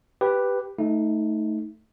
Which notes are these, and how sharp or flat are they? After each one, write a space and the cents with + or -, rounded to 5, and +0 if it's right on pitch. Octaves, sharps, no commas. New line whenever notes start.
G4 +0 B4 +0
A3 +0 D#4 +20